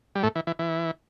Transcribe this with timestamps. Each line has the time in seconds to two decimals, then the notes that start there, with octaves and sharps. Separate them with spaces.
0.15 G3
0.23 A2 A3
0.35 E3
0.47 E3
0.59 E3